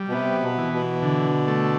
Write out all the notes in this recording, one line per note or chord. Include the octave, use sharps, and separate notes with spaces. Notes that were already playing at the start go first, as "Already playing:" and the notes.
Already playing: G3
B2
C3 B3
B2
E3
B2
D3
A3